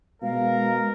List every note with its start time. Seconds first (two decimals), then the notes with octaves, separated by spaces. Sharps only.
0.22 B2 G#3 A#4 F5